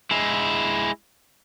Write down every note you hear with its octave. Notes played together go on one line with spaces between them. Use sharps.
G#3 E4